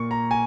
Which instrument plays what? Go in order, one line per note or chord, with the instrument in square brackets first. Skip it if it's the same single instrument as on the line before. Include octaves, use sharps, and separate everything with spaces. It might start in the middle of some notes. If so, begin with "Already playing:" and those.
Already playing: [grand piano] A#2 A#3 C#6
A#5
G#5